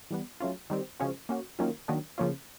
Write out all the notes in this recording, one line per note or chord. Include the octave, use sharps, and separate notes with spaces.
E3 G3 B3
F#3 A3 C#4 F4
D#3 G3 C4
C#3 F3 G#3 C#4 F#4
A#3 C#4 F#4
D#3 F#3 A#3 C#4 F4
D#3 F#3 A#3 D4
C#3 F3 A#3 C#4 F4